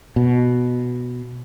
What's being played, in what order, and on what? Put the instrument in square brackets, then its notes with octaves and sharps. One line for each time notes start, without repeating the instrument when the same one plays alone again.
[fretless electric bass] B2